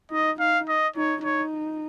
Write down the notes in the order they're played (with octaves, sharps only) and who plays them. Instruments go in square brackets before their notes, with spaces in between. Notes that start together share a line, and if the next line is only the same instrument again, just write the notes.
[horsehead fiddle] D#4 [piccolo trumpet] D#5
[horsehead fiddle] D#4 [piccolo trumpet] F5
[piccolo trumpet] D#5
[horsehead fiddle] D#4 [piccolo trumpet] C#5
[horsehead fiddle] D#4 [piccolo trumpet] C#5